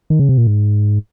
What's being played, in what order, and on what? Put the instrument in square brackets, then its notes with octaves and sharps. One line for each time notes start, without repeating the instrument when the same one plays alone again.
[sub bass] D#3
C#3
C3
A#2
G#2